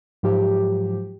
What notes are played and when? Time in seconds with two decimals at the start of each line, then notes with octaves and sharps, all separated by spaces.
0.23 G#2 F3 F#3 G4